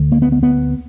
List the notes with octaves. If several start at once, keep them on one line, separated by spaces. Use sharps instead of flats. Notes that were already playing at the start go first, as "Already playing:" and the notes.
Already playing: D2 D3
A#3
B3
B3
B3